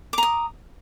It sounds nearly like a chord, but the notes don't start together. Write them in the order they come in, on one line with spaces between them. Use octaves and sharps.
D6 A#5 D#6